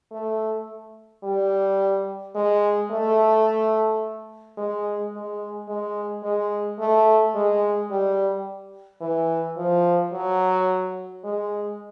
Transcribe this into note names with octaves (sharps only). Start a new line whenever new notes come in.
A3
G3
G#3
A3
G#3
G#3
G#3
G#3
A3
G#3
G3
E3
F3
F#3
G#3